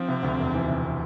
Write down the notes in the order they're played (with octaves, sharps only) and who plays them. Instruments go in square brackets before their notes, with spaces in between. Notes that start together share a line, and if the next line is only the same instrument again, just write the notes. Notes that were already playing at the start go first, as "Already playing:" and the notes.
Already playing: [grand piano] F3 [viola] C4
[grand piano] C3
D2
E1
E3
C3